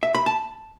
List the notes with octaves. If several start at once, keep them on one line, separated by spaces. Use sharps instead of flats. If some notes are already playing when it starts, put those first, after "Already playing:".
E5
B5
A5